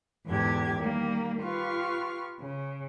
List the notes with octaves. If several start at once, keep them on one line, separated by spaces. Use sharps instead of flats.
E2 G#2 D3 G4 G#6
D#3 G3 A#3
F4 G4 B4 C#6 F6
C#3